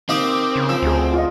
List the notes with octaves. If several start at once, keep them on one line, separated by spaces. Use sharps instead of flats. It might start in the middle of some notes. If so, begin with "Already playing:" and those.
A#3 C4 D#4 G4 D#5
C#3
F3 E6
D2 G#4 C5
F4 D5 D#5